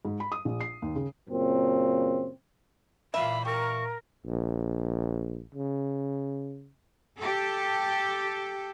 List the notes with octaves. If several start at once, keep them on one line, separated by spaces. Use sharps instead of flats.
G#2
B5
D#6
A#1
C7
D#2
C#3
F#2 A#2 C#3 C4
A#2 E3 A#3 E5 F5 B5
G4 A#4 C#6
A#1
C#3
G4 A4